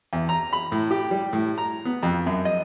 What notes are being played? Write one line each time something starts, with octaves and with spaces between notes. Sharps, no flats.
E2
A#5
B5
A2
G4
G3
A2
A#5
B3
F2
F#2
D#5